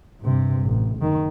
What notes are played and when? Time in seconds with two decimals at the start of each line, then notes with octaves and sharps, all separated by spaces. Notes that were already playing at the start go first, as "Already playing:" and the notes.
0.21 G2 C3
0.61 A1
0.97 F#1 D#3